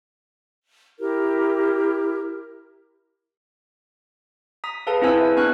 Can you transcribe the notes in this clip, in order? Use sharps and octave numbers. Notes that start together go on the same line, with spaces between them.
E4 G4 A#4
A#5 D#6 B6
G#4 A4 B4 F5 A5 A#5
C4 E4 B4 C5 G#5 E6
E5
B3 D4 G#5 C#6 F6 F#6